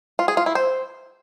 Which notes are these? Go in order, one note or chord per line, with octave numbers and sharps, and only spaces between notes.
F4
G#4
F4
E4
C5